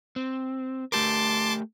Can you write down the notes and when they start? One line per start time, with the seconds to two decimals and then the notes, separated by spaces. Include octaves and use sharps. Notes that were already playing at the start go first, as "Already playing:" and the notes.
0.16 C4
0.92 A3 G4 A#4 A5 C6 D6